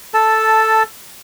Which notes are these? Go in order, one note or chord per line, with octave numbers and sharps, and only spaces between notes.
A4 A5